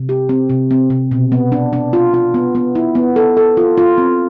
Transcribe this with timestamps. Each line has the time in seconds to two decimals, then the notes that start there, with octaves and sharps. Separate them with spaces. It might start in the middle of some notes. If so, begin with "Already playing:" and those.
Already playing: C3
0.09 G4
0.29 C4
0.50 C3
0.71 C4
0.90 C3
1.11 B2
1.32 B3
1.52 D4
1.73 D4
1.93 F4
2.14 F4
2.34 B3
2.55 B3
2.75 E4
2.95 B3
3.16 A4
3.37 A4
3.57 F4
3.78 F4
3.98 C4